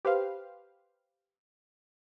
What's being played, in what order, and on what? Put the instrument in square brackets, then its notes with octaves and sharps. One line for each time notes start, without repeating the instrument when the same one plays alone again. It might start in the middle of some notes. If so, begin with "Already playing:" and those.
[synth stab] G4 B4 C5 F5